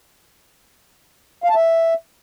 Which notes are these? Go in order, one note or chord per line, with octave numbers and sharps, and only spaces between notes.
F5
A5
E5